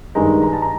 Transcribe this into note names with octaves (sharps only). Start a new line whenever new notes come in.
G2 D#3 G#3 A#5
A#5
A5
A#5